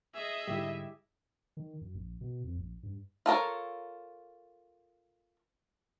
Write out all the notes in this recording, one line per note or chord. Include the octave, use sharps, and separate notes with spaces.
G#4 D#5 E5
G#2 D3 G3 E4 G4
D#3
F#2
A#1
B2
F2
A#1
G2
F4 A4 A#4 C#5